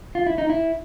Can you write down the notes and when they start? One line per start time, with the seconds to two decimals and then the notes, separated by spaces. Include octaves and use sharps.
0.15 F4
0.27 E4
0.38 D#4
0.50 E4